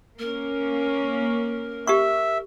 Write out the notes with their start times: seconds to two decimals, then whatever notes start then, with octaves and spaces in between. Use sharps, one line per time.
0.19 A#3 C#4 A#4
1.87 G4 E5 C#6